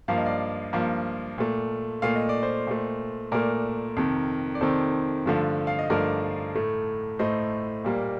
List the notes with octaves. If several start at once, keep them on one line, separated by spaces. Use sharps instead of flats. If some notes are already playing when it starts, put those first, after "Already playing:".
G2 F3 A#3 F5
D#5
D5 F5
G2 F3 A#3
A#2 A3
A#2 A3 F5
D#5
D5
C5 D#5
A#2 A3
A#2 A3 A#4 D5
F2 C3 D#3
D5
F2 C3 D#3 A4 C5
G2 D3 F3 A3
F5
D#5
G2 D3 F3 A3 A#4 D5
A2 A3
A2 A3 C5 D#5
A#2 G3 A#3